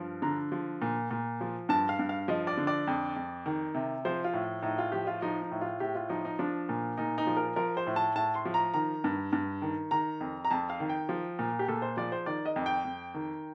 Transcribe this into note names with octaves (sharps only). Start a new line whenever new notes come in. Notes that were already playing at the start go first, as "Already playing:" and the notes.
Already playing: G2 F3
D3 A#5
F3
A#2
A#2
F3
G2 A5
F5
G2
F5
F3 D#5
D5
D3
D5
F2
F2
D#3
C3
F3 C5
F4
A2
A2 D#4
F4
F3 G4
F4
F3 D#4
D#4
A2
F4
A2 G4
F4
F3 D#4
D#4
F3 D4
A#2
A#2 D#4
D#4
F3
A#4
F3 A#4
C5
A2
A5
A2 A5
C6
F3
A#5
D#3 A#5
G2
G2
D#3
D#3 A#5
F2
A#5
F2 A5
F5
D#3
G5
F3
A#2
G4
A#2 A4
C5
F3 D5
C5
D#3 D5
D#5
F2
G5
F2
D#3